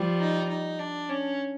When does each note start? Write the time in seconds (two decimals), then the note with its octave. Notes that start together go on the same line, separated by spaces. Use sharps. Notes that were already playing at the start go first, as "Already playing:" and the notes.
Already playing: F3 G3
0.19 D#4
0.49 D#4
0.79 D4
1.09 C#4